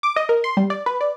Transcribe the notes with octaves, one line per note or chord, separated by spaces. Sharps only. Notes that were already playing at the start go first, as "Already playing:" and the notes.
D6
D#5
A#4
C6
G3
D5
B4
D5